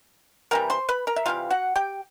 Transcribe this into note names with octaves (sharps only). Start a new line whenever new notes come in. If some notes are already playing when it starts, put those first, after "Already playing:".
C3 E3 G3 A#4 A#5
C5 C6
B4 B5
A#4 A#5
E5
C3 E3 G3 F4 F5
F#4 F#5
G4 G5